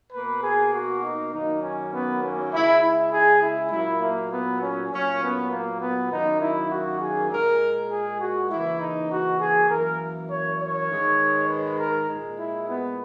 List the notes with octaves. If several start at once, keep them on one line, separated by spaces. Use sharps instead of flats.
B2 A#3 B4
G#4
F#4
D#4
F#2 D#3 F#3 A#3 D#4
C#4
B3
C#4
C#3 G#3 E4
E4
G#4
E4
A#2 F#3 A#3 E4
A#3
B3
C#4
A#2 F#3 A#3 C#4
B3
A#3
B3
F#2 D#3 F#3 A#3 D#4
E4
F#4
G#4
A#2 G#3 A#4
G#4
F#4
C#3 E3 A#3 E4
D#4
F#4
G#4
F#2 E3 A#3 A#4
C#5
C#5
G#2 D#3 G#3
B4
A#4
A#2 G#3
E4
B3